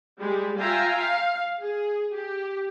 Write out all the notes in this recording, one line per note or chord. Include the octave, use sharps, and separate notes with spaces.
G3 G#3 G4
F4 E5 F5 G5 G#5 A#5
F5
G#4
G4